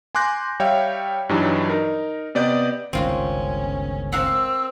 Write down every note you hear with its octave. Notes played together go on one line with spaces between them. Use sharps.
G#5 C6 D6 F#6 G6 A#6
G3 C#5 E5 F5 G5
G2 E3 F#3 G3 D4 D#4
D#4 A#4
C3 B3 D5 D#5 G6
G1 C#2 D#3 C4 C#4 F4 F#4
C4 A#4 F5 F#5 E6